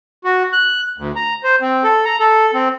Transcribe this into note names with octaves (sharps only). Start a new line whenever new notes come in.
F#4
F#6
D2
A#5
C5
C4
A4
A#5
A4
C4